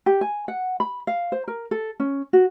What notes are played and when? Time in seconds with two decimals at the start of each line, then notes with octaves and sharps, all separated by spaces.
0.06 G4
0.21 G#5
0.48 F#5
0.80 B5
1.07 F5
1.32 C5
1.48 A#4
1.71 A4
2.00 C#4
2.33 F#4